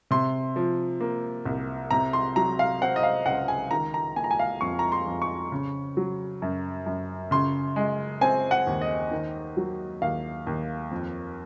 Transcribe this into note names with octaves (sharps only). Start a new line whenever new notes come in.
C3 C6
F3
A#3
C2
C3 A#5
C6
F#3 A#5
F5
C4 F#5
D#5
F5
C#2 F#5
G#5
D#3 A#5
A#5
A#3 G#5
A#5
G#5
F5
F2 C#6
A#5
C6
F2
C#6
C#3
F#3
F#2
F#2
C#3 C6
G#3
C4 G#5
F#5
D#2
D#5
D#3
F#3
D#2 F5
D#2
F2